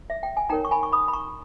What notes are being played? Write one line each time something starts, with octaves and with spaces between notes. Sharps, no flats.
E5
G5
G#5
D#4 A#4 C#5 G5 A#5
C#6
G#5 B5
C#6
B5 D#6
B5
A#5 C#6